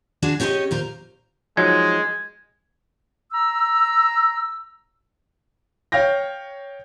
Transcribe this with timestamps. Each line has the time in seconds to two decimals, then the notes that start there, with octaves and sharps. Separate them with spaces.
0.22 G#3 D4 F#4 G#4
0.40 C#4 G4 G#4 C5 C#5 D#5
0.71 A#2 A#4 C5
1.57 F3 F#3 G#3 D#4 G#6
3.33 A#5 E6
5.92 C#5 F5 G5 G6 A#6